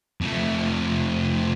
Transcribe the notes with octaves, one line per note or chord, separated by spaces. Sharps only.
F2 A3